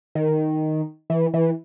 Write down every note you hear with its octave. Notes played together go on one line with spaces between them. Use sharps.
D#3
E3
E3